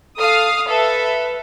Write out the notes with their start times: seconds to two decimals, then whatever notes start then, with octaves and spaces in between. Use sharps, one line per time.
0.18 A4 F5 D#6
0.69 A4 B4 E5